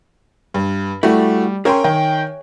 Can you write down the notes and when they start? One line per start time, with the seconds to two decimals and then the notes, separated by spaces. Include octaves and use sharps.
0.54 G2
1.03 G3 A3 E4 F#4
1.65 C#4 G#4 A#4 C#5 E5 G5 C6
1.84 D#3 G5